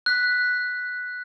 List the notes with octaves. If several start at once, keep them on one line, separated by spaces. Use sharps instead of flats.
F#6 B6